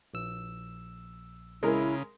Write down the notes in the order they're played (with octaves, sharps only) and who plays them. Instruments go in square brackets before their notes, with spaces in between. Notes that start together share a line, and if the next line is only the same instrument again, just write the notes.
[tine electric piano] A#1 E6
[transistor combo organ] C#3 [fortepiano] G#3 A#4 [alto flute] E4